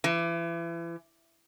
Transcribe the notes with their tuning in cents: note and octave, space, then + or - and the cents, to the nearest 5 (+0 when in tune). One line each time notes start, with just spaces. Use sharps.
E3 +35